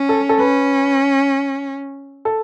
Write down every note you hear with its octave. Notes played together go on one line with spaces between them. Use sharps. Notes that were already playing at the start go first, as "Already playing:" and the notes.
Already playing: C#4
A4
A4
C#4 B4
A4